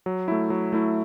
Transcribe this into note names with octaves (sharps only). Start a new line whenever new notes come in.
F#3
A3 E4
F#3
A3 E4